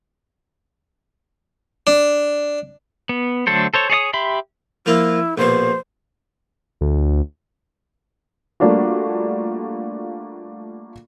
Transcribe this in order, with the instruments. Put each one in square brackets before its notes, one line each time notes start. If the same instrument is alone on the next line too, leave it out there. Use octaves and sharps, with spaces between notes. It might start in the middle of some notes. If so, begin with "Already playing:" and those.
[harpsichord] D4
[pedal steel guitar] B3
D3 F#3 A3 A4 C5
A4 C5 C#5
G#4 C#5 D5 D#6
G4 E5 B5 C6
[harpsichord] F3 A#3 F4 [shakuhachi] E4
[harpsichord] A#1 B2 [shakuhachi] C5
[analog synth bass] D2
[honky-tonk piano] G3 A3 A#3 D4 F4 F#4